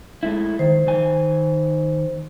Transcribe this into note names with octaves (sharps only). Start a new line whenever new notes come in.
G#3 A3 E4
D#3 C5
D#3 G#5